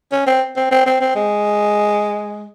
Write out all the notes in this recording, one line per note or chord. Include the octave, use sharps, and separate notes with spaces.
C#4
C4
C4
C4
C4
C4
G#3